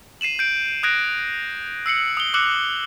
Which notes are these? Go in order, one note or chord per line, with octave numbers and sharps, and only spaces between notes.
C7 D#7 E7 F#7
G6 D7
D#6 F#6 G#6 A#6 D7
E6 C7 C#7 F#7
D#6 G7
D6 E6 F#6 C#7 F#7